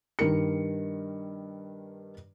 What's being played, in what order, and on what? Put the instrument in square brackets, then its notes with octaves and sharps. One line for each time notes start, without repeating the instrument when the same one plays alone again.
[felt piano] G2 D#3 A#4 C#7